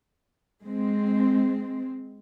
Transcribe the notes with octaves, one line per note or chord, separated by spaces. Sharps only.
G#3 C4